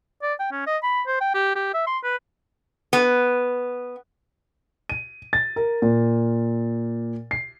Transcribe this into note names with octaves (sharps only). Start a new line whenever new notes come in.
D5
G5
C#4
D#5
B5
C5
G5
G4
G4
E5
C6
B4
B3
D#7
A6
A#4
A#2
C7